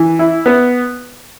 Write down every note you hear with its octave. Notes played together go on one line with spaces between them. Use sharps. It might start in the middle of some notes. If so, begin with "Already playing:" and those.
Already playing: E3
E4
B3